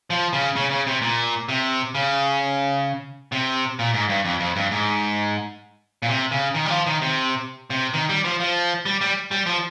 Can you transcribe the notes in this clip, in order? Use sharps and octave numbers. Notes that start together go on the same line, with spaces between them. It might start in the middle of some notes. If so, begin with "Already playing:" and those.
F3
C#3
C#3
C#3
C3
A#2
C3
C#3
C3
A#2
G#2
G2
F2
F2
G2
G#2
A#2
C3
C#3
D#3
G3
F3
D#3
C3
C3
D#3
G3
F3
F3
G3
G3
G3
F3